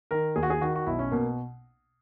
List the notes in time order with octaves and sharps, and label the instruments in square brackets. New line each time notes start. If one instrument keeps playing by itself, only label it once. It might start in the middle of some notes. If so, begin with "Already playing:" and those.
[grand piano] D#3 A#4
D#2 G#4
F#4
G#4
D#3 F#4
F#4
B1 E4
C#4
B2 A#3